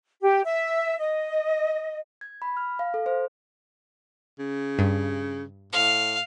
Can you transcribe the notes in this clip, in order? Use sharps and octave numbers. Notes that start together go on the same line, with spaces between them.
G4
E5
D#5
G#6
B5
F6
F5
A4
C5
C#3
G2
A2 F5